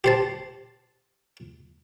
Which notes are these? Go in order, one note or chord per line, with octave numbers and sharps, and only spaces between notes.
G4 C5 A5